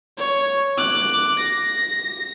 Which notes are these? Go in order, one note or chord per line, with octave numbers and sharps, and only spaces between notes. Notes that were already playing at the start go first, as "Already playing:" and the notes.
C#5
D6 F#6
A#6